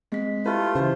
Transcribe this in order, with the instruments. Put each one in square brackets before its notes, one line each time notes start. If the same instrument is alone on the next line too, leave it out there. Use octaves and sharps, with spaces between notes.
[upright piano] G#3 [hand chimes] C4 B6
[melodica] A3 F4 [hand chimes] E4 G4 E5 [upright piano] B4
[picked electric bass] C#3 E3 [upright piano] C5